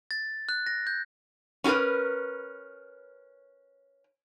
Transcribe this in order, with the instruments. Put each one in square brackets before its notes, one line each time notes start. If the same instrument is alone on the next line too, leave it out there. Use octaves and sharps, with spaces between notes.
[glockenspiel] A6
F#6
A#6
G6
[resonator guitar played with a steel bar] C#4 F4 F#4 A#4 B4